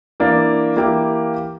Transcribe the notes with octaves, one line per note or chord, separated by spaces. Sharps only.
E3 A#3 D4
E3 A#3 E4 G4